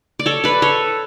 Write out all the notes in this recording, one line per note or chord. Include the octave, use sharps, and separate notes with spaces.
D5
A4 C#5
B4 D5
A4 C#5